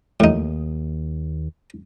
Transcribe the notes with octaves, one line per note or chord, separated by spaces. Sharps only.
D#2 A2 D#4